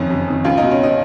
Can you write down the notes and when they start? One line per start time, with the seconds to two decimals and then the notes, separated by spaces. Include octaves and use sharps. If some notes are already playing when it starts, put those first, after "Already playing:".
Already playing: F#1 F2 D#3 C#4
0.10 F#1
0.28 F2 D#3
0.45 C#2 F4
0.58 B2 D#4
0.71 C#4
0.83 D#4